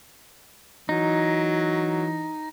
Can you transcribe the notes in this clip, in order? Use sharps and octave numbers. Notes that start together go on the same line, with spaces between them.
E3 F#3 D#4